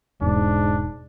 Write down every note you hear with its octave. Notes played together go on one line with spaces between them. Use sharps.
E1 G#2 B2 D4